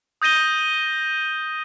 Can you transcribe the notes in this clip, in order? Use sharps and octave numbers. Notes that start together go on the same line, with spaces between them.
D#6 G6 A#6 D#7 G7